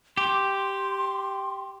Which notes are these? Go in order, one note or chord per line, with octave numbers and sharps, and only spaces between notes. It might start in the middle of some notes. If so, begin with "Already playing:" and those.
G4 C6